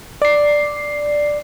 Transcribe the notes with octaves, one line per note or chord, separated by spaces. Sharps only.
D5 C7